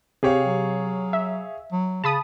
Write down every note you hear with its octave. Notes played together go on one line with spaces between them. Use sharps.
C3 G4 G#4 C#5 F5
F#3
E5
F#3
C#3 A5 B5 D#6